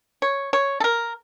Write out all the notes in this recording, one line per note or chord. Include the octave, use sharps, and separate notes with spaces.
C#5
C#5
A4
A#4